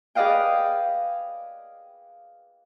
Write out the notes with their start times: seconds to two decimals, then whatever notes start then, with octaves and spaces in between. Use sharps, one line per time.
0.15 G#4 B4 D5 D#5 F5 G5